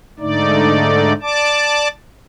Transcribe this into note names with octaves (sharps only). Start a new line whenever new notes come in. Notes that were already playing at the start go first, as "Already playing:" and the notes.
G#2 D3 A3 D#4 D5
D5 A5 D6